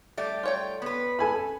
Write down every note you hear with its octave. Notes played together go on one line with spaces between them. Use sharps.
G3 A3 D5
F4 C#5 G5
B3 B4
A4 G#5 B5